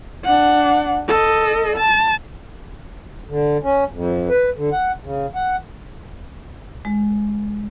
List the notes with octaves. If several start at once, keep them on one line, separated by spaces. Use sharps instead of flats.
D4 F#5
A4 D#5
A5
D3
C#4
F2
B4
D3
F#5
C#3
F#5
G#3